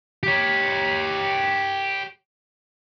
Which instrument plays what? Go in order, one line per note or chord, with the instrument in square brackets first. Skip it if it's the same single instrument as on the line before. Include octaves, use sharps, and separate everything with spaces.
[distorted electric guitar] G4 C#5